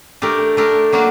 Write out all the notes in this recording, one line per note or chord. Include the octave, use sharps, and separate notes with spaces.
A3 D4 G4 A#4
A3 D4 G4 A#4
F#3 A#3 D4 F#4